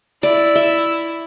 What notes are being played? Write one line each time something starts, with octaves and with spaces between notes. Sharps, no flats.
E4 D5
E5